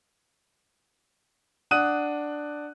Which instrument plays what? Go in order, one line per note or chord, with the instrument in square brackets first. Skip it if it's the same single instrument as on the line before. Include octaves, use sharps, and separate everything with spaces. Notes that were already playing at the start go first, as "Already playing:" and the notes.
[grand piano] D4 F#5 D#6 F#6 D#7